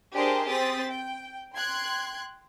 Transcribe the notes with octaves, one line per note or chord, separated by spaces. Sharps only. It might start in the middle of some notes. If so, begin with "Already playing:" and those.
D4 G4 G#4 A#4 C5 D#5
C4 D#6 A6 B6
G5
G5 C6 F#6 G#6